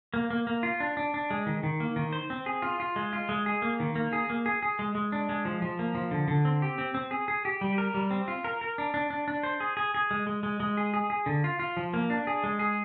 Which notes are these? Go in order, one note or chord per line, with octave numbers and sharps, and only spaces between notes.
A#3
A#3
A#3
F4
D4
D4
D4
G#3
D#3
D#3
A#3
D#3
C5
C4
G#4
F4
F4
G#3
F4
G#3
G#4
A#3
D#3
A#3
G#4
A#3
G#4
G#4
G#3
G#3
D4
G#3
F3
F3
A#3
F3
D3
D3
C4
G4
C4
C4
G#4
G#4
G4
G3
A#4
G3
C4
F4
A#4
A#4
D4
D4
D4
D4
C5
G#4
G#4
G#4
G#3
G#3
G#3
G#3
G#4
G#4
G#4
D3
F4
F4
F3
A#3
D4
G#4
G#3
G#4